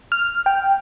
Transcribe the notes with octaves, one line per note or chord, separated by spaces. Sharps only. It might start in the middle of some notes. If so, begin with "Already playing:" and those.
F6
G5